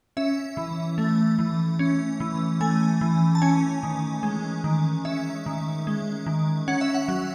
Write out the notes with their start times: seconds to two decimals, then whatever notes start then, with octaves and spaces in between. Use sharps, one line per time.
0.17 C#4 E5
0.57 E3
0.98 A3
1.39 E3
1.79 C#4
2.20 E3
2.61 A3 G#5
3.01 E3
3.35 A5
3.42 C#4 G#5
3.83 D#3
4.23 G#3
4.64 D#3
5.05 C#4 E5
5.46 D#3
5.87 G#3
6.26 D#3
6.68 C#4 F#5
6.81 E5
6.94 F#5
7.08 F#3